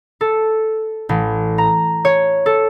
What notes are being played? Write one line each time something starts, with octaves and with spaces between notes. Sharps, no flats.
A4
A1
A#5
C#5
A4